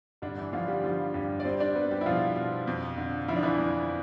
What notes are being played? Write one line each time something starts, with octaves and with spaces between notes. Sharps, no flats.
G2 D3 D4
E3 E4
D3 F3 F4
G3 G4
F3 F4
G2 G3 G4
D5
G3 C4 C5
D4 D5
G3 B3 B4
G3 G4
E4
B2 F3 F4
B2
F2
D3
F3 E4
D4
E3 E4
F2